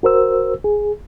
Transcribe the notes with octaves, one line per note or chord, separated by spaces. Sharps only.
F#4 A#4 C5 E6
G#4